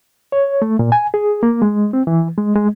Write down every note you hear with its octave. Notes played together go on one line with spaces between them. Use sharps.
C#5
A3
A#2
G#5
G#4
A#3
G#3
C4
E3
G#3
G#3